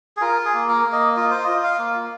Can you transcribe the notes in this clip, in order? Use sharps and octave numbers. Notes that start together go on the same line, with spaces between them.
G#4
F4 A#4
G#4
A#3
A#4
A#3
D#5
F4 D#5
C5
F4 D#5
F5
A#3